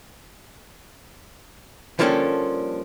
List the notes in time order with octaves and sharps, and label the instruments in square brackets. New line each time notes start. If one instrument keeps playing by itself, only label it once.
[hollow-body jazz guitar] D3 F3 G3 A#3 C#4 A4